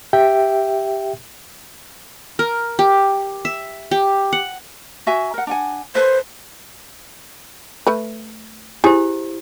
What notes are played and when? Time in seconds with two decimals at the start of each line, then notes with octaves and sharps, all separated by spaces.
0.13 G4 E5 G5
2.39 A#4
2.79 G4
3.45 E5
3.91 G4
4.33 F#5
5.07 F#4 E5 G#5
5.34 A#4 F#5
5.47 D4 F#5 G#5
5.95 A4 B4 C5 E5
7.87 A3 B4
8.84 E4 G4 G#4 C5